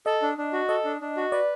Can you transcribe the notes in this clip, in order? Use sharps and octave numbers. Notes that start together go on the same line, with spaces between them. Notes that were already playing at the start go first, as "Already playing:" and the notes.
A4 D#5
D4
D4
F#4
A4 D#5
D4
D4
F#4
B4 D5